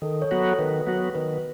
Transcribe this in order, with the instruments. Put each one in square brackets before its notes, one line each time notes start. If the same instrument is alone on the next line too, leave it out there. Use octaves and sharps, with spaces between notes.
[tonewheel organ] D#3 [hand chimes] A4
[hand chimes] C#5
[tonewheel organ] F#3 B3 F#4
[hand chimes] A4
[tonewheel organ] D#3 [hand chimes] B4
[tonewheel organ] F#3 B3 F#4
[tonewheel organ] D#3 [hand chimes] B4